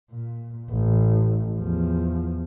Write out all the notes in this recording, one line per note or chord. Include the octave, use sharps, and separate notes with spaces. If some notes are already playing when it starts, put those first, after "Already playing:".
A#2
A1
E2 F3